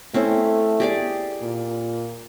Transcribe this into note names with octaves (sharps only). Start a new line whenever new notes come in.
A3 C4 C#4 E4
G4 G#4 D5
A#2